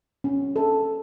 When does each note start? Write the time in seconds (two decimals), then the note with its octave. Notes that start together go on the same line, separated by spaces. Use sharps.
0.24 C#4
0.56 A4